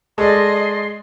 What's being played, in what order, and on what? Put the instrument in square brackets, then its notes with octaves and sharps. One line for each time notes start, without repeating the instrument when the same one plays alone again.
[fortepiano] G#3 [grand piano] A4 D5 [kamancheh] D#5 [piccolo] C6